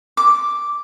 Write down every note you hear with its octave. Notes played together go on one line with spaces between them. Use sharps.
D6